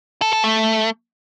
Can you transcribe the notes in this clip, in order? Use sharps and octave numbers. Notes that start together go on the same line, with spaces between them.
A4
A4
A3